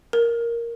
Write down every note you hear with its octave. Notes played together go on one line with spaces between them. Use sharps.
A#4